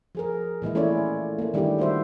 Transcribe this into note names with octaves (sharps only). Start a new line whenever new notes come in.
F3 G#4 A#4
A#2 E3 G#3 E4
A3 C#4 E4 F4 C#5 D5
A3 A#3
D#3 G3 A3 D4 E4 G4
G3 F#4 C5 E5